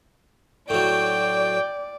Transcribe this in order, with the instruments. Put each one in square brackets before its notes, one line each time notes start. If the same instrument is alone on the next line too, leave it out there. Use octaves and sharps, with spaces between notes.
[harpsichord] A2 F#3 [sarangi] D5 [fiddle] G5